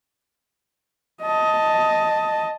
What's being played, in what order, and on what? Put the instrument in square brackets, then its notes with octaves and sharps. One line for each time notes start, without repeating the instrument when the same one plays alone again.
[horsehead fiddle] D#5 A5